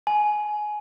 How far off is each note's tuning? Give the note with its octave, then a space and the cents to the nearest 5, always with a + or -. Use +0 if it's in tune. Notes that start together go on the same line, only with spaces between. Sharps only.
G#5 +20